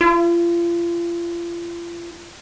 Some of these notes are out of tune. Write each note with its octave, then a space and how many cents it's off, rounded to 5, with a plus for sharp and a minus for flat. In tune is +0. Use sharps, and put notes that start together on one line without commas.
F4 -35